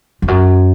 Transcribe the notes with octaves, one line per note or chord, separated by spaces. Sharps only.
F2
F#2